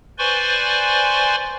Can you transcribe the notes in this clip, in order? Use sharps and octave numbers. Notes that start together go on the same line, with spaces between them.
B4 C5 D5 G#5 C6 C#6